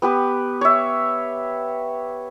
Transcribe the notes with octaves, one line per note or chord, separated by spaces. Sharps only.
B3 G4 B4
C#5 E5